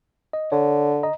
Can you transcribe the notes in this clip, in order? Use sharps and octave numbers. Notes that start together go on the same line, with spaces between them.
D#5
D3 C#5
D#5 A#5